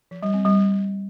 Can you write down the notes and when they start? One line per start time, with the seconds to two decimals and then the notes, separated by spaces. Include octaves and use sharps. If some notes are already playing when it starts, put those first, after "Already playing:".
0.11 F3
0.23 G3
0.34 C4
0.45 G3